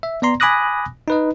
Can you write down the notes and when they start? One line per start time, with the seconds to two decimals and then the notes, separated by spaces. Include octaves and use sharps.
0.03 E5
0.22 B3 D5 A#5 C6
0.40 G#5 B5 D6 D#6 F#6 A#6
1.08 D#4 B4 D#5